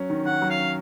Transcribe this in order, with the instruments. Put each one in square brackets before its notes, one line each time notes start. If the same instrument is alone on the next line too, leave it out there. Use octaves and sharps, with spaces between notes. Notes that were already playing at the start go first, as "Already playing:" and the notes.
Already playing: [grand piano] F#3 C#4
D#3
[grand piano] D#3 [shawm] F#5
[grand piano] F#3
[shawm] F5
[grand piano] C#4